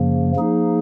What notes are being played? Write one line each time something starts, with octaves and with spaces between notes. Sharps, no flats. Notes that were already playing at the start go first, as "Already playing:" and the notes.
Already playing: F#2 C#3 F3 A#3
F3 A#3 D#4 G#4